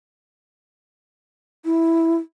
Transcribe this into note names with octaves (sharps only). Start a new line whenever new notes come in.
E4